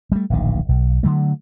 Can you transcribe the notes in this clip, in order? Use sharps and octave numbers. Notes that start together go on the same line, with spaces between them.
G3 A3
D1 A#1 D#3
B1
D3 F#3 A3